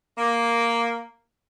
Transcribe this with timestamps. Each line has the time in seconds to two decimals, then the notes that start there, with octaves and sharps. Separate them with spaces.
0.17 A#3